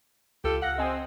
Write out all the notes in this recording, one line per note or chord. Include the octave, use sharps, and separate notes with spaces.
C#2 F4 G4 A4
F5 F#5 A#6
C4 D#5 G#5 D#6